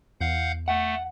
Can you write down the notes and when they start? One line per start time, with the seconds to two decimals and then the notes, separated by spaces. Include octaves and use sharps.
0.21 E2 F5 F#5 G6
0.68 A3 F#5